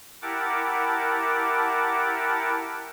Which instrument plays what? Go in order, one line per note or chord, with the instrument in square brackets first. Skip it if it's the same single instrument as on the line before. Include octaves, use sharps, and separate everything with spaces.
[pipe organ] E4 G4 A#4 F#5 A5 D6